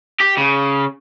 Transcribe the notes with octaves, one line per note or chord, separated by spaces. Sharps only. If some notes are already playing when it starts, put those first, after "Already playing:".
G4
C#3